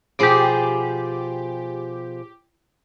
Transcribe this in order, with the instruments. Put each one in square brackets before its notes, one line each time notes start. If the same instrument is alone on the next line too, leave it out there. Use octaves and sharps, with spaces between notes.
[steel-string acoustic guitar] B2 F3 G#4 [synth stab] G4 D6